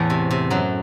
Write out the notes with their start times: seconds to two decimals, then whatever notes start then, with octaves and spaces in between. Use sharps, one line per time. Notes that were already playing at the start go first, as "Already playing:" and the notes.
Already playing: E2 A2 E3 A3
0.10 C3
0.31 C3
0.50 F#2 F#3